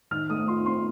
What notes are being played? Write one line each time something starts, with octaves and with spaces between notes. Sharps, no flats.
D#3 F6
A3 D#6
F4 C6
C4 C6